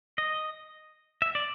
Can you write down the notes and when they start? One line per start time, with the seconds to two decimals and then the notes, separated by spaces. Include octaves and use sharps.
0.18 D#5
1.22 E5
1.35 D5